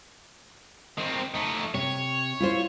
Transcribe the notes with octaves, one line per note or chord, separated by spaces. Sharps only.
D#3 C4
A3 D#4
C3 C#5
E4 F4 C5